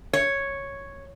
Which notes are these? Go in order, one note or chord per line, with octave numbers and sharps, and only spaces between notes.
C#5